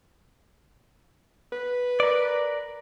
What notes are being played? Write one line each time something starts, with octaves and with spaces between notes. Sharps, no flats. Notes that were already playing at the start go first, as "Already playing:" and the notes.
B4
A#4 D5